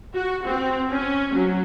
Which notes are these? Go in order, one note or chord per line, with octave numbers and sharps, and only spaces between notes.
F#4
C4
C#4
F#3